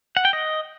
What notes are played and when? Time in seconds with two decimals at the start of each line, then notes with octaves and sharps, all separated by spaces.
0.17 F#5
0.25 G5
0.33 D#5